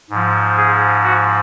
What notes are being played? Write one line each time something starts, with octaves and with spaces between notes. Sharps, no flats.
G#2 F3
G#4
F#4